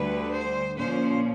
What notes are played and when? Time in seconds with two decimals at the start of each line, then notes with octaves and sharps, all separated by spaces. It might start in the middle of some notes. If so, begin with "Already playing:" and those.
Already playing: D2 D3 G3 B4
0.35 C5
0.76 A#2 F3 A#3 C#4 C5